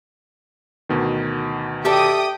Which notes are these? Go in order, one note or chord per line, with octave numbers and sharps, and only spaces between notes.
D2 B2 D#3
G4 A4 D5 E5 G5 D#6